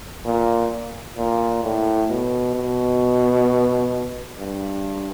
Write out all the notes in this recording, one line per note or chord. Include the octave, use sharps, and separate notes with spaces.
A#2
A#2
A2
B2
B2
G2